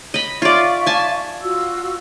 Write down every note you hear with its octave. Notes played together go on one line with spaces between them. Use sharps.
D#5 B5
F4 D5 E5 F5 C#6
G#5 A5
F4 F#4 E6